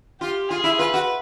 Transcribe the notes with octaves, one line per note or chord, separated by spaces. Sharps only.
F4 G4
F4 G#4
E4
F4 B4
F#4